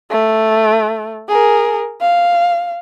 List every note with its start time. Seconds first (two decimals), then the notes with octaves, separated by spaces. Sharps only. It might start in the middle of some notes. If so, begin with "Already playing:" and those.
0.10 A3
1.28 G#4 A#4
2.01 F5